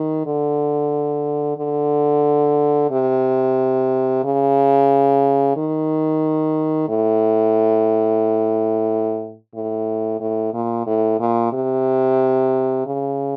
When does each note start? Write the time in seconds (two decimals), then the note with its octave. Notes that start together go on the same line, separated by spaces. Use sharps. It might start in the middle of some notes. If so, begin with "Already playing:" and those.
Already playing: D#3
0.26 D3
1.58 D3
2.91 C3
4.24 C#3
5.56 D#3
6.89 A2
9.54 A2
10.20 A2
10.54 A#2
10.87 A2
11.20 A#2
11.53 C3
12.86 C#3